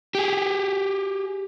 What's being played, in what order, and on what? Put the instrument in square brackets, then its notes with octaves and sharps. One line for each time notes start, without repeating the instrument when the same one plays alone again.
[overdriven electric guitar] G4 G#4